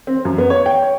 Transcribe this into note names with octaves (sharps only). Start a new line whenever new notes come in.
C4
F#2
B3
C#5
G5
C#5